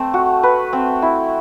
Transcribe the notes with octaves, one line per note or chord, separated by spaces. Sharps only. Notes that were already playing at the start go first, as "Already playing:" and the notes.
Already playing: A3 C4
F#4
B4
C4
E4